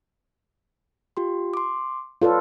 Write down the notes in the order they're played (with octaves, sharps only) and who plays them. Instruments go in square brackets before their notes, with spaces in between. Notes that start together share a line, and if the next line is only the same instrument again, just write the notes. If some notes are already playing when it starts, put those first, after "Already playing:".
[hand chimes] F4 G4 C6
C6 D6
[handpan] F4 A4 B4 [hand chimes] C#5 D5